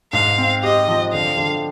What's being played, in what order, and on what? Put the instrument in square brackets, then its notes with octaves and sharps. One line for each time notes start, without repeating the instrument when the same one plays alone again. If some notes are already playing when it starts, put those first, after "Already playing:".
[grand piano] G#2 [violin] F5
[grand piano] C4
[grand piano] G4 [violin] D#5
[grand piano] F3
[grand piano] D3 [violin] F5
[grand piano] D3